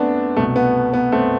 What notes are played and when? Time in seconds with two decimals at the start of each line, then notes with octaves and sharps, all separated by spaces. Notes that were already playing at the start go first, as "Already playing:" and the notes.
Already playing: F#2 A3 B3 C4 D4
0.37 C2 B2 A3
0.56 B3
0.94 B3
1.12 A3 C4